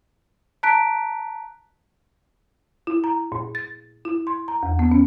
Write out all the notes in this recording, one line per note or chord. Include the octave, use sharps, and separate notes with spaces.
A5 A#5 F#6 B6 D7
E4
A#5
A#2
A6
E4
C6
A#5
E2
B3
C#4